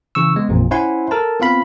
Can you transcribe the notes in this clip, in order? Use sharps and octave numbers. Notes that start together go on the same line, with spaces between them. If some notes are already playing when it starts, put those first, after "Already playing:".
C#3 E3 C#6 E6
G#3 B3
A1 F2 A#2
C#4 E4 C5 F#5 G#5 C6
A4 A#4 A5
B3 C4 F4 F5 B5